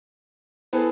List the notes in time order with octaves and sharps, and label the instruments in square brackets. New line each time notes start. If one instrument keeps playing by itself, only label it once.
[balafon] B3 E4 C5 [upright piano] G#4 A4 B4